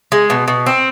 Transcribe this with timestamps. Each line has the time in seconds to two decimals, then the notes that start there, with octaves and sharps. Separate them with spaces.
0.12 G#3
0.30 B2
0.48 B2
0.66 C4